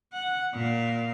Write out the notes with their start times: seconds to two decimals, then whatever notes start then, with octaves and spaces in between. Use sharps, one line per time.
0.13 F#5
0.54 A#2 F5